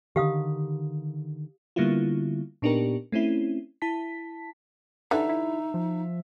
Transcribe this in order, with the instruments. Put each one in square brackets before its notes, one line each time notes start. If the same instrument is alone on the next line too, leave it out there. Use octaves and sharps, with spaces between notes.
[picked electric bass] D3 D#3 [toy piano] G4 F5 D#6
[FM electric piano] D3 G3 A#3 B3 E4 F4
A#2 B3 D4 D#4 G4 A#4
A3 C4 C#4 E4
E4 A5 B6
[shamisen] D3 E3 G3 [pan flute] D#4 [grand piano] E5
[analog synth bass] E4
F3